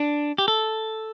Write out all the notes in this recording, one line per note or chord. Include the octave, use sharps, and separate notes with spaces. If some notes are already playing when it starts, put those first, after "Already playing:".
Already playing: D4
G4
A4